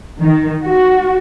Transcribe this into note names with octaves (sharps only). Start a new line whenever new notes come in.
D#3
F#4